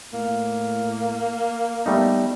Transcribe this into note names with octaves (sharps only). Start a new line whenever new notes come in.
A2 A#3
G3 A3 B3 D#4